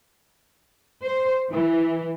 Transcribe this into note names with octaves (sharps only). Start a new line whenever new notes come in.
C5
E3